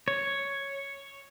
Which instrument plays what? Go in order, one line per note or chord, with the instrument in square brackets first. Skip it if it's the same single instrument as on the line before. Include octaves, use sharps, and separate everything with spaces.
[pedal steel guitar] C#5